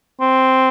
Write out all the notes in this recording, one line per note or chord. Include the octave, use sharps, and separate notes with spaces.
C4